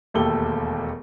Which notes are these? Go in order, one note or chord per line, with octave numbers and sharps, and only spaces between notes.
E1 D#2 A3 G4 A4 G7